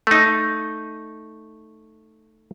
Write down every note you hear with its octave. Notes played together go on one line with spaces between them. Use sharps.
A3 D#4